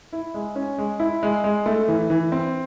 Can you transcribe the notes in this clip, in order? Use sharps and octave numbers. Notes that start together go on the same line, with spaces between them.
E4
G#3
C#4
G#3
E4
G#3
G#3
A3
E3
E3
C4